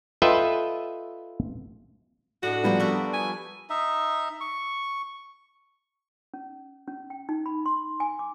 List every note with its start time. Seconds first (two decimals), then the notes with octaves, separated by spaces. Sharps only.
0.22 F4 A4 B4 D#5 E5 G5
2.43 A2 D4 F#4 D5 D#5 F#5
2.64 F3 G3 A#3 B3 C5 E5
2.80 D4 A#4 B4 C#6 E6
3.13 G#5
3.70 D#4 E5
4.40 C#6
6.34 C#4
6.87 C#4
7.10 G5
7.29 D#4
7.46 B5
7.66 C6
8.00 G#5
8.19 D6